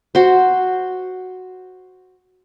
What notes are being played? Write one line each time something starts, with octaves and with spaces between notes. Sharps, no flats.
F#4 C5